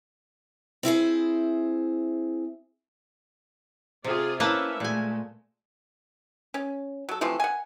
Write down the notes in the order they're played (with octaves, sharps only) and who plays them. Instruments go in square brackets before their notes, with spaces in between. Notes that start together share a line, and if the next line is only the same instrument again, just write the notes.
[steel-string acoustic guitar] C4 E4 G#4 C5
[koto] C3 [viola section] F4 G#4 D5
[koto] A#3 B4 A5 [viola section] C#4 E4 E5
[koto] A#2 G#5 [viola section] G#3 A3
[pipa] C#4
F#3 A4
C3 E3 F3 A3
F#5 G#5